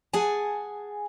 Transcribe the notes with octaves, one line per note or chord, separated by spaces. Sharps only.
G#4 F#5 G#5 A5